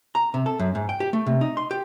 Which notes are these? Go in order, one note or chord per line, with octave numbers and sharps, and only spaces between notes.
A#5
C3
A4
F#2
G#2
G5
G4
A3
C3
D#4
C6
G4